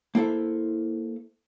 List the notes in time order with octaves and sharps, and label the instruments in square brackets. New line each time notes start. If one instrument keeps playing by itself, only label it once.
[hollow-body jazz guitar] A#3 E4 A4 C5 E5